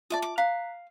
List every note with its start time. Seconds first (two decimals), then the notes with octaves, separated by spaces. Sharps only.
0.10 F4 D5 E5 A5 D6 D#6
0.22 D6
0.38 F5 A#5 F#6 B6